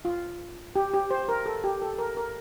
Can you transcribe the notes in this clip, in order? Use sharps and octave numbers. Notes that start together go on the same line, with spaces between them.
F4
G4
G4
C5
A#4
A4
G4
A4
A#4
A#4